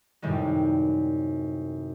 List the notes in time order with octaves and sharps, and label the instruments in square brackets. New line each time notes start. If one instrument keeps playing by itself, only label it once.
[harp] F#2 A2 C3 D#3 G3 G#3